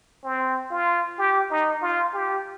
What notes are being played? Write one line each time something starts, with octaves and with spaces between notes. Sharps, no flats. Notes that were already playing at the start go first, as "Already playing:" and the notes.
C4
F4
G4
D#4
F4
G4